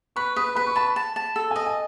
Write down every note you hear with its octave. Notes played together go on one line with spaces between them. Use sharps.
B4 C#6
B4 D#6
B4 B5
C#6
A5 B5
A5
A5
A4
G#5
D#5
G#5